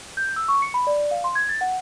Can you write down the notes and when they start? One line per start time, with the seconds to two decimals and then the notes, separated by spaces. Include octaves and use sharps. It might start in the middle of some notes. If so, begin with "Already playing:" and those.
0.17 G6
0.36 E6
0.48 C#6
0.62 C#7
0.74 B5
0.87 D5
1.11 F5
1.24 C6
1.35 G#6
1.49 A6
1.61 F#5